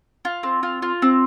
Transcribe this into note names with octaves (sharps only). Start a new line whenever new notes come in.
F4
C4
F4
F4
C4